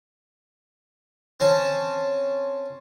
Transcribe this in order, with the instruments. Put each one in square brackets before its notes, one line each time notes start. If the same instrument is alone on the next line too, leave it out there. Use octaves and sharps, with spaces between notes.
[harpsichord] C4 C#4 A5